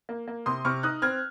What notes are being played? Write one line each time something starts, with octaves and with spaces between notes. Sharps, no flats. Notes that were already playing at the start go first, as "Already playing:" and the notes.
A#3
A#3
C3 C6 D#6
C3 C#6 F6
D#4 D#6 F#6
C4 F6 G#6